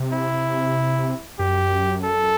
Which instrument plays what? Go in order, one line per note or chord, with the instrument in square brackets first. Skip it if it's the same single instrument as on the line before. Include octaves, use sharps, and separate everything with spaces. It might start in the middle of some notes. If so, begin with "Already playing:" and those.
Already playing: [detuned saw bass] C3
[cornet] E4
[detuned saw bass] F#2 [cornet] G4
[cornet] A4